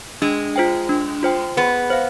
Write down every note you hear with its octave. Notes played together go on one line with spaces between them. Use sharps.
G#3 D4
F4 C5 G5
D4
F4 C5 G5
B3 G#4
C5 F5